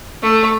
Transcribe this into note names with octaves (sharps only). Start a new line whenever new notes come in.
A3